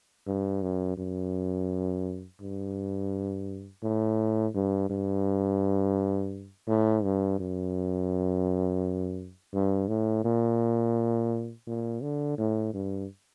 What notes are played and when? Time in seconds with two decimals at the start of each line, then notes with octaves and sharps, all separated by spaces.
0.27 G2
0.62 F#2
0.98 F#2
2.40 G2
3.83 A2
4.54 G2
4.90 G2
6.68 A2
7.03 G2
7.39 F#2
9.53 G2
9.88 A2
10.24 A#2
11.67 A#2
12.02 D3
12.38 A2
12.74 G2